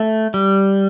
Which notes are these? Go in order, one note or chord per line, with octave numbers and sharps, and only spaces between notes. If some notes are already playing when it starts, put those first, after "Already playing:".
Already playing: A3
G3